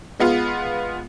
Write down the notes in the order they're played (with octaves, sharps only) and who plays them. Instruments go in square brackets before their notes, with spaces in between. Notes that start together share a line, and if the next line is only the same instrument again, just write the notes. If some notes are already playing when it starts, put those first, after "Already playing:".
[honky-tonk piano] G#3 B3 F4